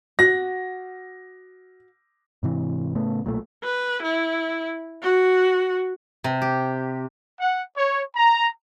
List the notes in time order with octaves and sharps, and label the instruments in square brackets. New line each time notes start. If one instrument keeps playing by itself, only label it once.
[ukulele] F#4 [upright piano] A#6
[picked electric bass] G#2 C3 E3
A2 C#3 A3 B3
B1 A#2 F#3 A3
[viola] B4
E4
F#4
[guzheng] C3
G4
[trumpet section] F#5
C#5
A#5